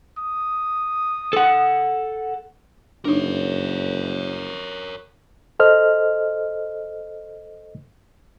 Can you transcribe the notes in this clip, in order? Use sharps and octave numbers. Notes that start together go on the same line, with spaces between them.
D#6
A4 F#5
F#1 D4 D#4 A#4 C#5
A4 C5 D#5 F6